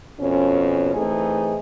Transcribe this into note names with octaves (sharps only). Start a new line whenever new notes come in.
F2 B2 C#4
E3 A3 C4 D#4 G#4